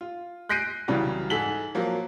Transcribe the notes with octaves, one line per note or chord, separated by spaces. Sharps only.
F4
F#6 G6 A#6 C7 D7 D#7
C2 C#3 E3 F#3 G3
G#2 G#4 A4 B6 F#7
F3 F#3 A#3